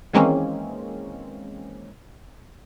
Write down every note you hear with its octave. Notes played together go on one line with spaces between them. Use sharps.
D#3 E3 G#3 A#3 C4 C#4